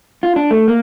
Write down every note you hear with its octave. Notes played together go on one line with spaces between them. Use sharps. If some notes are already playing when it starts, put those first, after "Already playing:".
F4
D4
A3
A#3